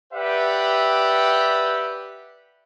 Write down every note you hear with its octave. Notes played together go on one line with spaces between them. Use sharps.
G4 B4 D5 E5 F#5 G5